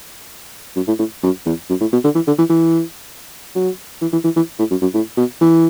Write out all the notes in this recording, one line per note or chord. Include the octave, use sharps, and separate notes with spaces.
F#2
A2
A2
F#2
E2
F#2
A2
B2
D3
E3
D3
E3
E3
F#3
E3
E3
E3
E3
A2
F#2
F#2
A2
B2
E3